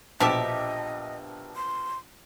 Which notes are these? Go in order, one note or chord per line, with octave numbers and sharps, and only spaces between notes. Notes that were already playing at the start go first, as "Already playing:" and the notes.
A#1 B2 F3 D4 G4 D#5 E5 D6
C6